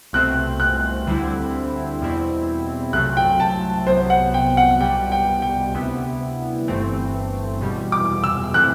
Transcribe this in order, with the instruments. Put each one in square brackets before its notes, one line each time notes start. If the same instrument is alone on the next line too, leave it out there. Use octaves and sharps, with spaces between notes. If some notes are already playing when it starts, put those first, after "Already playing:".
[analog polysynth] C2 B2 A3 C4 [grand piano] F#6
[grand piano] F#6
[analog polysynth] D2 D3 G3 C4 E4
E2 B2 G3 C4 E4
[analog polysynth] C2 C3 F#3 A3 C4 [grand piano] F#6
[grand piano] G5
A5
[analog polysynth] C2 C3 F#3 B3 [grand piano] C5
[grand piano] F#5
G5
F#5
[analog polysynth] C2 B2 G3 [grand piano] G5
[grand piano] G5
G5
[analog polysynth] D2 C3 G3 B3 E4
G1 G2 E3 A3 C4
E2 B2 G3
[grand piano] D6
E6
[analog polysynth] E3 A3 C4 E4 [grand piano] F#6